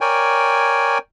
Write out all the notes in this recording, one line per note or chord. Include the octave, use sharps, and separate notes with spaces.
A#4 C#5 D5 G5 G#5